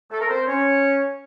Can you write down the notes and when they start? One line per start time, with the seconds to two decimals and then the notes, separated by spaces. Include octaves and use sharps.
0.10 A3 A4
0.21 A#4
0.28 C4 C5
0.47 C#4 C#5